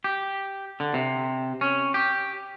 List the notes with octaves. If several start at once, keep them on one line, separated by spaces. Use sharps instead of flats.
G4
D3
C3
C#4
G4